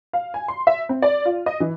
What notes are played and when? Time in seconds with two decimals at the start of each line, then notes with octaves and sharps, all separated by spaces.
0.13 F5
0.34 G#5
0.48 C6
0.67 E5
0.89 C4
1.02 D5
1.25 F4
1.46 D#5
1.60 E3